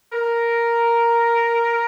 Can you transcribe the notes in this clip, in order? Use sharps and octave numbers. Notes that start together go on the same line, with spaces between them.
A#4